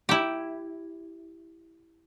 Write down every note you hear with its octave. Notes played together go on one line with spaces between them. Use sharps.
E4 G4